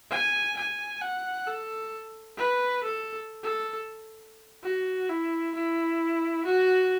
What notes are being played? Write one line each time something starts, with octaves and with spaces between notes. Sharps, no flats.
G#5
G#5
F#5
A4
B4
A4
A4
F#4
E4
E4
F#4